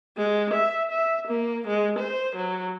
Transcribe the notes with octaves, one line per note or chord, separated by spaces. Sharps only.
G#3
E5
E5
A#3
G#3
C5
F#3